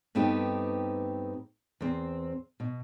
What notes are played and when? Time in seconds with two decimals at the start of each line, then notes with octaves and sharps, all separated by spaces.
0.15 G2 A3 B3 C4 D#4 G4
1.81 E2 C4
2.60 B2